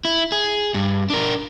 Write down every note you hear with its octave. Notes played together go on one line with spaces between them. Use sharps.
E4
G#4
G2
D4 A#4